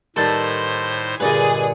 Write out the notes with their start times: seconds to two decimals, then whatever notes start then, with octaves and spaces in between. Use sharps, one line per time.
0.16 A2 D#3 G3 A4 B4 C5 A5 C6
1.20 G2 A#2 D3 G#4 B4 D5 D#5